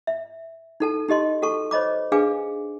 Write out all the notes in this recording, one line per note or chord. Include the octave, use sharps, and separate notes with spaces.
E5
D#4 A4 A5
D#4 G4 D#5 C6
F#4 A4 A5 C#6
C5 C#5 D#5 B5 D6
D4 G#4 B4 F5 G#5 D6